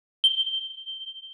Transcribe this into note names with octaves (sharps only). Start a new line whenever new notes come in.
G7